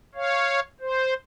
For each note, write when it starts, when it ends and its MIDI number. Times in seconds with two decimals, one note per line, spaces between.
0.15 0.60 73
0.15 0.60 77
0.80 1.14 72